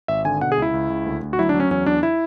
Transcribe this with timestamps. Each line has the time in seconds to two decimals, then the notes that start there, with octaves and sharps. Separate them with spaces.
0.08 G#1 E5
0.25 D3 G#5
0.41 B2 F#5
0.52 G#4
0.58 C#2 E4
0.74 C#2
0.90 C#2
1.06 D2
1.22 D2
1.33 F#4
1.39 F#3 E4
1.49 D4
1.54 F#3
1.60 C#4
1.71 E2 C#4
1.86 E2 D4
2.03 E4